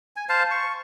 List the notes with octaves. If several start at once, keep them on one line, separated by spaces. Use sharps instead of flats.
G#5
C5 F5 A5
C#6